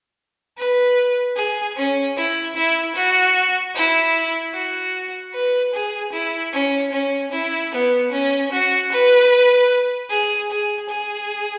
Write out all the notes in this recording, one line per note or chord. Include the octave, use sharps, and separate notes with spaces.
B4
G#4
C#4
E4
E4
F#4
E4
F#4
B4
G#4
E4
C#4
C#4
E4
B3
C#4
F#4
B4
G#4
G#4
G#4